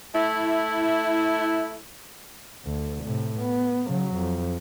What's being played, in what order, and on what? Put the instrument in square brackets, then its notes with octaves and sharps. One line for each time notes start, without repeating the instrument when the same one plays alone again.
[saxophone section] A3 E4
[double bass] D2
A2 C3
B3
C#3 F#3
F2